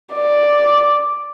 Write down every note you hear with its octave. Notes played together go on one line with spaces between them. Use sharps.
D5